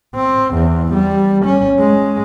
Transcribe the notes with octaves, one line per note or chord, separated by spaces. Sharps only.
C4
E2
G3
C#4
G#3